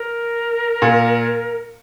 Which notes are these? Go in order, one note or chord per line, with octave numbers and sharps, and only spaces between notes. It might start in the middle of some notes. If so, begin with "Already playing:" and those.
Already playing: A#4
A#2